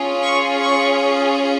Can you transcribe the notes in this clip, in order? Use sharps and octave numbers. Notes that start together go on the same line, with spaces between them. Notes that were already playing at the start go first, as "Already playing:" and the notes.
Already playing: C#4 F4 G#4
C#6
C#6